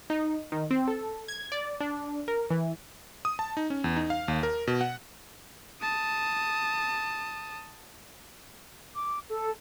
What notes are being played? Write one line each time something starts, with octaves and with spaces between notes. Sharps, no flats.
D#4
D#3
C4
A4
G#6
D5
D4
A#4
E3
D#6
A5
D#4
C#4
E2
D#4
F5
D#2
A#4
B2
F#5
A5 D#6
D6
A4